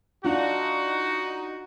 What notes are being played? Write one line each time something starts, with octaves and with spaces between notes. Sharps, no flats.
D4 D#4 F4 F#4